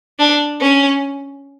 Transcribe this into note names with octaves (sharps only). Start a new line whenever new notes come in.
D4
C#4